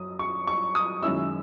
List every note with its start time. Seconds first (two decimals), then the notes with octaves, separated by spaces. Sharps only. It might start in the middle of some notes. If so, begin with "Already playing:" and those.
Already playing: F#2 D#6
0.19 C#6
0.47 C#6
0.75 D#6
1.03 F#2 D#3 G#3 C#4 E4 E6